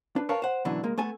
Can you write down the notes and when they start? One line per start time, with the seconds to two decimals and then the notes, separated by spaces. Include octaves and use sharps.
0.16 D4 B4
0.29 A#4 B4 C#5 F5 A5
0.42 C5 F#5
0.65 F#2 B2 D3 E3 D4
0.83 C#2 G#3 A#3
0.98 A3 B3 A4 G#5